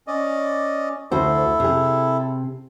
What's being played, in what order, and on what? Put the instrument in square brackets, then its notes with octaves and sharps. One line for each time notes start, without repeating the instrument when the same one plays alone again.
[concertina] C#4 D5 D#5
[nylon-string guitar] D2 F#4 C5 [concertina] E4 A4
[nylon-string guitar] C3 G#4